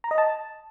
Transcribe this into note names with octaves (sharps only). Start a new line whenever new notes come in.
A#5
D#5
A5